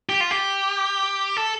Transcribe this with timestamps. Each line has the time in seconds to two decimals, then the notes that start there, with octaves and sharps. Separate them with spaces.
0.09 G4
0.21 F4
0.31 G4
1.37 A4